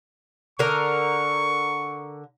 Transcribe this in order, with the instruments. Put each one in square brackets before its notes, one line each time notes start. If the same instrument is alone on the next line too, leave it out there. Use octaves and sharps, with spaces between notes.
[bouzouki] D3 A#4 [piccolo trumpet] C#6